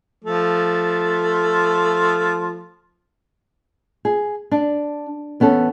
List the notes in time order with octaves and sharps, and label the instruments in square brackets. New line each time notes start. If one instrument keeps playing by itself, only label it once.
[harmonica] F3 A3
[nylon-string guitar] G#4
D4
E2 B3 C#4 A4